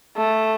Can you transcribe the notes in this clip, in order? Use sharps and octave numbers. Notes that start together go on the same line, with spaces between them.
A3